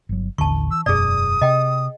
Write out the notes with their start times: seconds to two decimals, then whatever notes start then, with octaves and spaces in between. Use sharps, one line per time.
0.09 G1 F#3
0.38 A1 D#2 D3 A5 C#6
0.71 E3 E6
0.86 E1 F#2 B2 G#4 D5 D#6
1.42 C3 D#5 G5